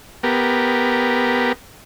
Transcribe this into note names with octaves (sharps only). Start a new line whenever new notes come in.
B3 G4 A#4